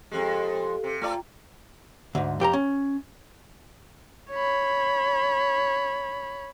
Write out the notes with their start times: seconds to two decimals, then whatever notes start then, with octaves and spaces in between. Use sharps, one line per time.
0.12 F2 G#3 G4 A4
0.84 C3
1.01 A3 F4 D5 G5 A#5
2.15 D2 G#2
2.40 F2 G4 A#4 A#5
2.53 C#4
4.31 C#5 B5